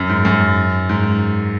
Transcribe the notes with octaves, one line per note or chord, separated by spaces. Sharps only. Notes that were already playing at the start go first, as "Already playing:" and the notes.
Already playing: F#2
G#2
F#2
G#2